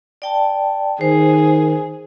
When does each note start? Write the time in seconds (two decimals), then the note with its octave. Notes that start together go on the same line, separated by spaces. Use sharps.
0.22 D5 G5 A5
1.01 D#3 G#4 C5